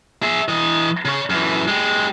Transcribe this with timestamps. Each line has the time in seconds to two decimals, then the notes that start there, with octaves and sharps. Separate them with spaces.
0.23 G#4 E5
0.48 E3 D#5
1.05 C#3 C#5
1.30 F#2 E3
1.68 G#3 G4